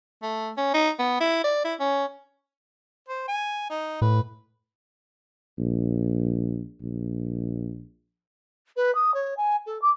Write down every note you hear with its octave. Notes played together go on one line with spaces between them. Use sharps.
A3
C#4
D#4
B3
E4
D5
E4
C#4
C5
G#5
D#4
A2 B4
A#1
A#1
B4
D#6
C#5
G#5
A4
D6